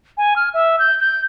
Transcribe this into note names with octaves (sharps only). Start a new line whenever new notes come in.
G#5
F6
E5
G6
G6